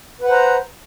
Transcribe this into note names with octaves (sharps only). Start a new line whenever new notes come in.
B4 C5 F#5 A#5